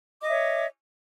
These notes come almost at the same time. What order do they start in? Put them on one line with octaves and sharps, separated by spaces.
D#5 D6 E5 C#5